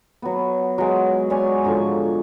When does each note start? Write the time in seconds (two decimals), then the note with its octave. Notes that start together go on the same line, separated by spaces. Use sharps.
0.22 F#3 B3
0.78 F#3 G#3
1.30 C#5 D5 G#5
1.64 G#2 D3 F3 C#6